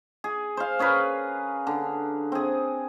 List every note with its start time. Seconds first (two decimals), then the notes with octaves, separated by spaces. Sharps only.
0.24 G#4
0.57 C5 F5
0.79 C#4 G#4 A#4 B4
1.67 D3
2.32 C4 G#4